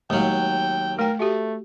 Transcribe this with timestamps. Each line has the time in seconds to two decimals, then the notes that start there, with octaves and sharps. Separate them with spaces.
0.10 D#2 F#3 G#3 A3 G5
0.99 A3 A#4 G5
1.19 A3 F#4 G4